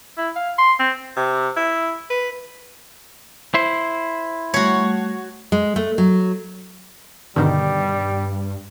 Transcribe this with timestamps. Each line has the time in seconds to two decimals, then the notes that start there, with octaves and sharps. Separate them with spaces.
0.18 E4
0.36 F5
0.58 C6
0.79 C4
1.17 C3
1.57 E4
2.10 B4
3.54 E4 C5
4.54 G3 A3 F#4 C#5 F#5
5.52 G#3
5.76 A3
5.98 F#3
7.36 G2 B2 D3 D#3 G3